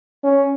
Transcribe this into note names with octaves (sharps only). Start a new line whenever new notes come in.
C#4